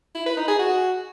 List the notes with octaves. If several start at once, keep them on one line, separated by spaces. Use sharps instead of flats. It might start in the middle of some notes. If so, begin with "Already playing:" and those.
E4
B4
D#4
G#4
F#4